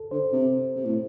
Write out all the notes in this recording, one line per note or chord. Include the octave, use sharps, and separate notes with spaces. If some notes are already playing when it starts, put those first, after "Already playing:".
Already playing: A4
D3 C5
C3
C3
A2